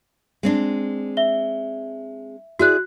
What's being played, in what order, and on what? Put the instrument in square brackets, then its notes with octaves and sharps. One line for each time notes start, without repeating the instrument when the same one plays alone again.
[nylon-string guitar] G#3 C4 D4
[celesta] E5 G7
[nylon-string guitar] E4 G#4 D5 [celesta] F#4 F#6